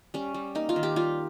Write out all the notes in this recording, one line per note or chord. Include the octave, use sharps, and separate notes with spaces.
G3 C#4
G3
A#3 D#4
F4
D#3
G4
G3 F4